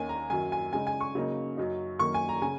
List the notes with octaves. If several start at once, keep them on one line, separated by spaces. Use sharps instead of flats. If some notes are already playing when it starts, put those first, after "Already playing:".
Already playing: D#2 D#3 A#3 C#4 G#5
A#5
F#2 D#3 F#3 G#5
G#5
C#3 G#3 D#4 G#5
G#5
C#6
C#3 F#3 A#3 D#4
F#2 F#3 D#4
F#2 D#3 A#3 C#6
G#5
A#5
C#3 G#5